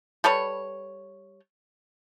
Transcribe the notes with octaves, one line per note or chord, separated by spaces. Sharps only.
G3 A4 B4 C#5